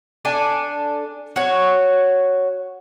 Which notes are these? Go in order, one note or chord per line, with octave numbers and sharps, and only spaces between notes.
D4 A4 G#5
F#4 C#5